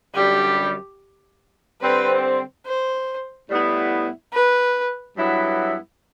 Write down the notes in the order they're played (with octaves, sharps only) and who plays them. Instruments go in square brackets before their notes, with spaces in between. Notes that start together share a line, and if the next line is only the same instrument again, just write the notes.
[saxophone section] F#2 D3 G3 [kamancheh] G4
[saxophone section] D3 G3 C4 [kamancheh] B4
[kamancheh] C5
[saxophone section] A2 G3 B3 E4
[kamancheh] B4
[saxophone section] G2 F#3 B3 E4